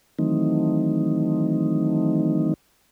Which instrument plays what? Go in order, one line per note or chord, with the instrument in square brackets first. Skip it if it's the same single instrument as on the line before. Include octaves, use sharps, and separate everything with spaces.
[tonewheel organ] D#3 E3 F#3 A3 C4 D#4